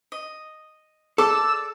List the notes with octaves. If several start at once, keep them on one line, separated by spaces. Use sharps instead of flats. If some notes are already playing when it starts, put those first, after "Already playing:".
D#5
G#4 A4 D5 D6 E6